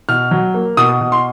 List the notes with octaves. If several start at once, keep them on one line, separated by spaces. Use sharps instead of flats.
B2 F6
F#3
A#3
B2 D#6
B2
C6